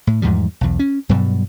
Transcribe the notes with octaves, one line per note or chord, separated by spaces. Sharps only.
A2
E2 G#2 F3 G3
B1 E2
C#4
G2 B2 F#3 G3